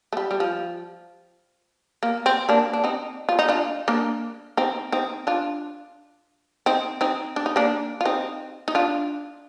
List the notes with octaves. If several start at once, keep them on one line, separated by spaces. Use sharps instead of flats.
A3
G3
G3
F3
A#3
C4
A#3 D4
D4
C4 D#4
F4
D#4
D4 F4
A#3 D4
C4 D#4
C4 D#4
D4 F4
C4 D#4
C4 D#4
D4
D#4
A#3 D4
F4
C4 D#4
D#4
D4 F4